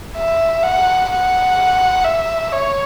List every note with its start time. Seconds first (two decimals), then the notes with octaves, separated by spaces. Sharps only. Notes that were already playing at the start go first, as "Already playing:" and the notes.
0.17 E5
0.63 F#5
1.10 F#5
2.04 E5
2.52 C#5